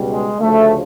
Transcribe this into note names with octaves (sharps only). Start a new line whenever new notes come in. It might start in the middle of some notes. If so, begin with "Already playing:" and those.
Already playing: C#2 B2 G3
G#3
D2 C#3 F3 A3